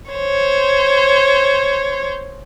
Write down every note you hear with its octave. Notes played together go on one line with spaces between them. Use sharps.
C5 C#5